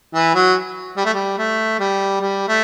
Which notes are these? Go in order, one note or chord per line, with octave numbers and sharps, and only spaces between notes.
E3
F#3
G3
A3
G3
A3
G3
G3
A3